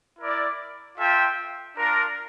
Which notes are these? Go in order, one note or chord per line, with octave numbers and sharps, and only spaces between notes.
E4 A#4 D5
F4 A4 E5 G5
D4 F4 A#4